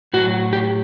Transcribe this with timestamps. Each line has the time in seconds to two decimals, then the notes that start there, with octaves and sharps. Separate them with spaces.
0.14 A2 F#3 F#4
0.53 G4